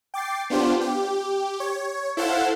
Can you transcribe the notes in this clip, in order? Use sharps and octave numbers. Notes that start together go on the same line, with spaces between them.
G5 D6 A6 C7
B3 D4 F4 G4 C5
G4
C#5
E4 A4 C5 F5 F#5